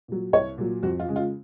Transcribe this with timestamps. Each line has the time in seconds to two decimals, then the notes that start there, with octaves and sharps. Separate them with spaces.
0.08 A#2 F#3
0.33 C2 C#5
0.58 A#2 F#3
0.83 F2 F#4
1.00 F4
1.08 C#3 G#3
1.16 F4